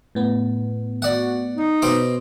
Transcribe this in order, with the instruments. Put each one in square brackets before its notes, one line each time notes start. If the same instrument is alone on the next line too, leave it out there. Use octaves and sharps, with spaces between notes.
[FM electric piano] A2 B3
[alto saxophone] F#4 [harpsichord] D5 F#5
[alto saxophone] D#4
[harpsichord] B2 C5 D6